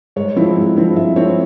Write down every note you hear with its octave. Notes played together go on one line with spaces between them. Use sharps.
G#2 C#5
F3 C4 E4
G#2
F3 C4 E4
G#2 E5
F3 C4 E4 C#5